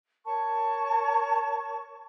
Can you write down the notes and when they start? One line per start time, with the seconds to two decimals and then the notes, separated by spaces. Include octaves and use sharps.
0.25 A#4 C#5 A5 C#6